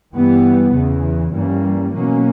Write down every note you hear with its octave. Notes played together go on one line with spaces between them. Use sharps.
G2 E3 G3 B3
E2 C#3 E3
G2 E3 G3 A#3 C#4
B2 F#3 A#3 C#4